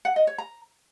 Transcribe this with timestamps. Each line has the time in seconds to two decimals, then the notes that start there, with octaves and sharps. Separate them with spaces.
0.05 F#5
0.16 D#5
0.27 C#5
0.38 A#5